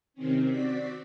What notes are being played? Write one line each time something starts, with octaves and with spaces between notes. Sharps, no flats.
C3 D#3 C4 C#4
C4 F#4 D5 B6